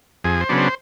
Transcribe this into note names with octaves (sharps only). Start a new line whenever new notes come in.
F2 G#4
C5
C#3 F#3 B3 D4
C5